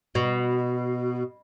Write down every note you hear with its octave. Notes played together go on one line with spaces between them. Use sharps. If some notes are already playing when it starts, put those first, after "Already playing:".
B2